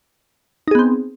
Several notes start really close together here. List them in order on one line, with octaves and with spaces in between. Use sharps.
D#4 G#4 B3 C4